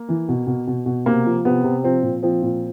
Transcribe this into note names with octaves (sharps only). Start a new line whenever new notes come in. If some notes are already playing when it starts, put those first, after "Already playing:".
Already playing: A#3
E3
B2
B2
B2
B2
C3 A#3
F3
C3 B3
C3
F3 C4
A#2
F3 C4
A#2